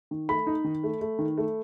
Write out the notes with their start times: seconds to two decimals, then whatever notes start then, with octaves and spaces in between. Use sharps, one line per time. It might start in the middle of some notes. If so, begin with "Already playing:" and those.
0.11 D#3
0.29 A3 B5
0.47 D#4
0.64 D#3
0.83 A3
1.01 A3
1.19 D#3
1.38 A3